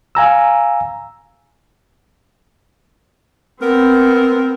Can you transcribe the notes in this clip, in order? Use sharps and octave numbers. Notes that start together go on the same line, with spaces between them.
F5 G#5 A#5 E6
B3 C4 A#4